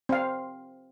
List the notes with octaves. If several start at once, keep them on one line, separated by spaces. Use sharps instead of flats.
C4 F5